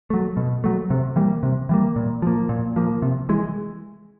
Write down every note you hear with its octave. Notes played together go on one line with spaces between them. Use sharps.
F#3 A3
B2
F#3 A3
C3
E3 G3 A#3
C3
E3 G3 A#3
A#2
F3 A#3
A#2
F3 A#3
C3
E3 G#3